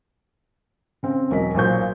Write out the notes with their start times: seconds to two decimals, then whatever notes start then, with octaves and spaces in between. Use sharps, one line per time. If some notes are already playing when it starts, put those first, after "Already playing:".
1.03 C#3 C4 C#4
1.31 E1 F#3 A#4 D#5 B6
1.54 B1 A#2 F#3 C5 C#6 G6